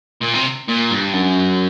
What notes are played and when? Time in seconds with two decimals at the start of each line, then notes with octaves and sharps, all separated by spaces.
0.23 A#2
0.35 C3
0.69 A#2
0.91 G2
1.14 F#2